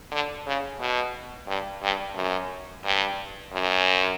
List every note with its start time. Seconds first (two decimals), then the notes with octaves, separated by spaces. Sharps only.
0.11 D3
0.47 C#3
0.80 B2
1.48 G2
1.83 G2
2.16 F#2
2.84 G2
3.52 F#2